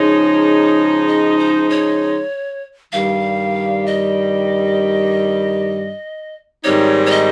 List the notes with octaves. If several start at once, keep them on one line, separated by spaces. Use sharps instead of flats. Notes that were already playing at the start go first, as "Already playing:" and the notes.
Already playing: C#3 F3 G#3 D#4 C#5
D#5
C5
C#5
G2 D#3 G3 F5
D#5
G#2 D#3 G3 C4 D#4 C#5
C#5
D#5